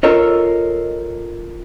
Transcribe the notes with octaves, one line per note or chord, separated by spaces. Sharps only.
F4 A4 A#4 C#5 D#5